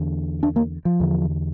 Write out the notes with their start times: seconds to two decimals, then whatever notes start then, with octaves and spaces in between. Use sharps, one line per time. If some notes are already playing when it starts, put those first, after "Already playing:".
Already playing: E2 D3
0.43 D4
0.56 A#3
0.85 F3
1.00 E2 D3